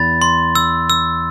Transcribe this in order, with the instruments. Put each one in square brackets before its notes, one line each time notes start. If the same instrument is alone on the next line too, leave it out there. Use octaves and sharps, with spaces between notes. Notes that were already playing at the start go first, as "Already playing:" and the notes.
Already playing: [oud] E2 [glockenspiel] B5 A6
[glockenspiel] C6
E6
E6